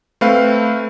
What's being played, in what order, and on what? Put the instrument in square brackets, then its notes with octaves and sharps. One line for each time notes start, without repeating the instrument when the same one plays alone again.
[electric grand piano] A3 C4 B4 F5